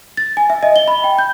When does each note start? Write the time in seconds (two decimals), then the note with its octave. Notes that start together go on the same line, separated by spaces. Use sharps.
0.17 A6
0.37 G#5
0.50 E5
0.63 D#5
0.76 G7
0.88 B5
1.04 G5
1.18 G6